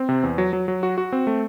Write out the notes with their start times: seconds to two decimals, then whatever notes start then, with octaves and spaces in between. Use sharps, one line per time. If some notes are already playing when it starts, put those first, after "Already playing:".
Already playing: C4
0.09 C3
0.23 E2
0.38 F#3
0.53 F#3
0.68 F#3
0.83 F#4
0.98 F#4
1.12 C4
1.27 A3